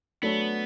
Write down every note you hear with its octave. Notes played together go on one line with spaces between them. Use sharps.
F#3 A3 B3 D4 A4 C#5